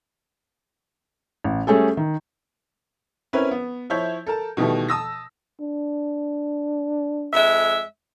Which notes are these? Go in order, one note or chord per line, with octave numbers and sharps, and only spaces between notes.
A1
G3 A3 C#4 G#4 A4
D#3
C4 C#4 E4 A#4 B4 C#5
B3
F3 E4 C#5 E5 G6
A4 A#4 A5
B2 D#3 E3 G3 A3
A5 D#6 E6 A#6
D4
F2 G#3 E5